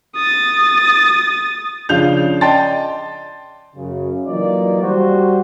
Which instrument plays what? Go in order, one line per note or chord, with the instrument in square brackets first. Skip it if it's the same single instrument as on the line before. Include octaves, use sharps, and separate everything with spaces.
[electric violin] D#6 A6
[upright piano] C#3 F3 D4 F5 G6 F7
D5 D#5 G5 A5 C6 A6
[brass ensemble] F#2 C#3
E3 F#3 A#3 D#4 F4 D5
G3 F#4 C5